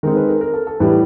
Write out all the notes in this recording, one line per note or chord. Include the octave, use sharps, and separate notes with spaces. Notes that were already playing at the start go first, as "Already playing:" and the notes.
D#3 G#3 C4 D#4 A#4
B4
A#4
A#4
A4
A4
A2 E3 G3 B4